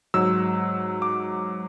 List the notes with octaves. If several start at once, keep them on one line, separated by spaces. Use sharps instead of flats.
G#2 F#3 E6
D6